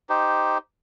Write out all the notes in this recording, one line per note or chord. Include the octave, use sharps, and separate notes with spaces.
D#4 G4 C5